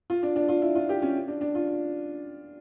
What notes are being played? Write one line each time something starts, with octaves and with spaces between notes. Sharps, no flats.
F4
D4
D4
F4
E4
F4
G4
C#4
D4
D4
F4